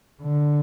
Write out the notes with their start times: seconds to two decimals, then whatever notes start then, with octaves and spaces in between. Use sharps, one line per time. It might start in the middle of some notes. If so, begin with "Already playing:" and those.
0.22 D3